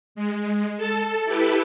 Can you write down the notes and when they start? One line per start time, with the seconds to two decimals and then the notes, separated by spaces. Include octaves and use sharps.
0.15 G#3
0.77 A4 A5
1.25 E4 G4 A4 B4